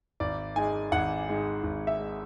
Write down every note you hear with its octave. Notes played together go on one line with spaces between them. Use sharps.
G#1 D5
G#2 G#3 G#5
G#1 F#5
G#2 G#3
G#1
E5
G#3